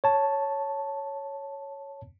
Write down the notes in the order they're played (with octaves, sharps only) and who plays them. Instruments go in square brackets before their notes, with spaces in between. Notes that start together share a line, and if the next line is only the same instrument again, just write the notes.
[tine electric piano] C#5 A5